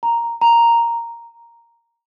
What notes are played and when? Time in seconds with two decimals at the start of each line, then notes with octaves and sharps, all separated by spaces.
0.03 A#5
0.41 A#5